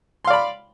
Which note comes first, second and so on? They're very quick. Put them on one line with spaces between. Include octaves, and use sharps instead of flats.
C6 F5 D5 B5